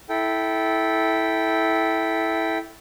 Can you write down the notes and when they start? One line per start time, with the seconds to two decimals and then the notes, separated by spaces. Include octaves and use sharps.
0.09 E4 A4 G5